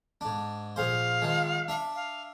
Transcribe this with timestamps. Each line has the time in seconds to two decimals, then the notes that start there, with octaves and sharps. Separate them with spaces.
0.21 G#2 D4
0.76 A#1 G#4 C5 F5
1.22 D#3 F3 G#3
1.68 D4 E5
1.95 F5